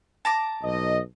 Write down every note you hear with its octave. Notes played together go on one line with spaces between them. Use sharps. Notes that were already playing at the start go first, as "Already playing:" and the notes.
A5 A#5 D6
B1 D#5